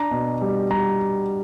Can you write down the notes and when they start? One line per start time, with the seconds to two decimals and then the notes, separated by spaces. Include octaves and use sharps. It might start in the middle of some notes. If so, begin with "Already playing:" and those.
Already playing: D4 A#5
0.11 B2
0.42 G3
0.71 G3 A#5